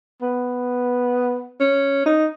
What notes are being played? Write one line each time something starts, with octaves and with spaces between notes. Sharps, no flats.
B3
C#4
D#4